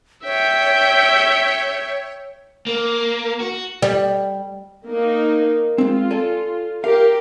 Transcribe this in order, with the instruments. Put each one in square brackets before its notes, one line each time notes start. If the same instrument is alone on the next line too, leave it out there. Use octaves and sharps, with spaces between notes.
[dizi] C#5 [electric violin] E5 G5
[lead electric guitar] A#3
F#4
[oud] G3
[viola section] A#3 D#4
[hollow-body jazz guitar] G#3 C4 [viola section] F4
[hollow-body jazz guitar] A4 D5 G#5
[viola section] G4 A#4 [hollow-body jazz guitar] F5